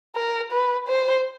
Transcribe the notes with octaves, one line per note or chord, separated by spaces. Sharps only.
A#4
B4
C5